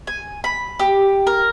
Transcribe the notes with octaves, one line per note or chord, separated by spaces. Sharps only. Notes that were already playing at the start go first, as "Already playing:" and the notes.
G#5
B5
G4
A#4